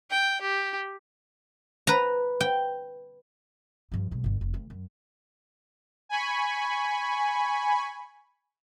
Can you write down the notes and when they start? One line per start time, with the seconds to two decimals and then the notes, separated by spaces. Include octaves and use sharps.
0.10 G5
0.41 G4
1.87 B4 A#5
2.41 G5
3.92 G2 F3
4.11 B1 G#3
4.24 G1 D3
4.41 F1
4.54 D2
4.70 F#2
6.09 G#5 B5 C#6